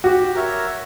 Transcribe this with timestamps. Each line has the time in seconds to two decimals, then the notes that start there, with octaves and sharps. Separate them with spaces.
0.04 F#4 G4
0.35 A#4 C#5 E5